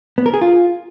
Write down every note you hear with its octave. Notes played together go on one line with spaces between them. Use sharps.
B3
A#4
G#4
F4